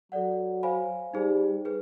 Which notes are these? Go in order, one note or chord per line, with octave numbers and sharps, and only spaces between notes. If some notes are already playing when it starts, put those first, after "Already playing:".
F#3 A4 D5 F#5
C5 F5 G#5 B5
G3 D#4 G#4 C5
G#4 B4